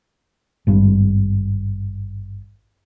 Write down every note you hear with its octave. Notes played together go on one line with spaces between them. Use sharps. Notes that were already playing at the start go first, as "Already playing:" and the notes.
G#1 G2